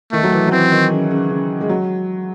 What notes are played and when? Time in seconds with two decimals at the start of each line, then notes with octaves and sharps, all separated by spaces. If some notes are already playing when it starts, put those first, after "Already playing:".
0.12 D#3 A3
0.23 F#3
0.32 E3
0.47 F#3
0.51 E3 C4
0.71 D#3
0.91 C#3
1.11 C#3
1.30 C#3
1.61 G#3
1.69 F#3